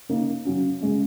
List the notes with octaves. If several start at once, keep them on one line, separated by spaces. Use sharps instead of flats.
C#3 A#3 D#4
C#3 F#3 C#4
C#3 G#3 C#4